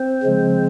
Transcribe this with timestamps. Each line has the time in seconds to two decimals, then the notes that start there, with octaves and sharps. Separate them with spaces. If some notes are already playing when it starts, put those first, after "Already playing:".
Already playing: C4 C5
0.23 C#3 F3 G#3